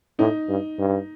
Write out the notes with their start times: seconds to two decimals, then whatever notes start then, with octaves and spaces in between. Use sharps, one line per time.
0.19 A2 D#4
0.49 G2
0.79 G2